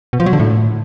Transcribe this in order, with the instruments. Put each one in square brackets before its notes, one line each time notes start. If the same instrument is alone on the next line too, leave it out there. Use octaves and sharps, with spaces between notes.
[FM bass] B2
F3
F#3
D3
A2